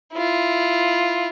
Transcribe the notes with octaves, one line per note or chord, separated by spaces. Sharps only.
E4 F4